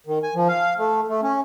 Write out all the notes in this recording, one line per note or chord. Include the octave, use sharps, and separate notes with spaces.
D#3
G#5
F3
F5
A3
A3
C#4